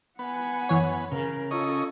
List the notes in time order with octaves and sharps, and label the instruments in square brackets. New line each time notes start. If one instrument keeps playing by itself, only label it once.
[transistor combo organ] B3 [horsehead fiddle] F#5 G#5
[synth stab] F#2 E3 C#5
[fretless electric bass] C#3 [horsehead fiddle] A#4
[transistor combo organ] C#4 D#5 [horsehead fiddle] F4 A4